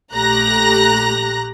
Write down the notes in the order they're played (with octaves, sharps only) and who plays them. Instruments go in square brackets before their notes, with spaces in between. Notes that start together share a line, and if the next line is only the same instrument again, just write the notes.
[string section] A#1 A3 G4 A#5 F#6 A#6